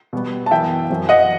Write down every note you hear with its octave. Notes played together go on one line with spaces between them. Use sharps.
B2 G3 B3
A5
F#2 E3 B3 E5 G5
F#2 F#3 C4
D#5 F#5